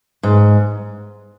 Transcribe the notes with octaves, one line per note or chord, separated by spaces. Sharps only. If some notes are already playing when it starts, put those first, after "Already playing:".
G#2